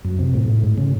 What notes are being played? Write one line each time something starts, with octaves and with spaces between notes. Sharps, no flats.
F#2
C3
A2
A2
G#2
C#3